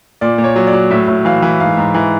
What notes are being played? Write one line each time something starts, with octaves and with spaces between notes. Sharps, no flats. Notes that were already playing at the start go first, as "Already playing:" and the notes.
A#2 D5
A#2
C#5
F#3
D5
F#3
A2 E5
A2
E3 F5
E3
G#2 F5
G#2
E3